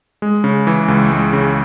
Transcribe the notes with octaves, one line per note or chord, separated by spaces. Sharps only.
G#3
C#3
E3
C#2
G#3
C#3